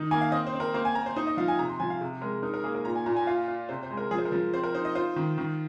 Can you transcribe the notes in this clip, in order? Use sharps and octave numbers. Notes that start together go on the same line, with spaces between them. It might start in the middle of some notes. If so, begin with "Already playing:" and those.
Already playing: D#3 D#4
A#3 G#5
F5
C4 D#5
C5
C4
A#4
A#3 C5
G#5
A#3 A#5
C5
D#4 C5
D#5
F3 F5
G#5
C3 A#5
C6
F3 G#5
F5
C3
G#3 A#4
D#4 A#4
A#4
A#3 G#4
A#4
A#2 A#5
G#5
A#2 A#5
G#5
F4 F5
F4
C3 C5
C5
G#3
A#4
F3 G#4
C5
A#4
F3
C4 C5
A#4
D#4 C5
D#5
F4 C5
D#3
D#3